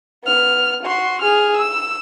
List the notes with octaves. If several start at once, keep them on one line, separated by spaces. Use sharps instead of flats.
B3 F6
F#4 C6
G#4 F6
E6